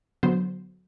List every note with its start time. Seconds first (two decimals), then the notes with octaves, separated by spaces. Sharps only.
0.23 D3 F#3 B3 C5